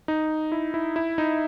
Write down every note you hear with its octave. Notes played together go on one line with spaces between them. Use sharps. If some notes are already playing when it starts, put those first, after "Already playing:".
D#4
E4
E4
E4
D#4